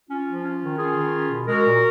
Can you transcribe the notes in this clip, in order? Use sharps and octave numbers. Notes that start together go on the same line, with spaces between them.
C#4 F4
F3
C#4
D#3
C#4 F4 G#4
D#3
C#4
B2
G#3 F#4 A#4
A#2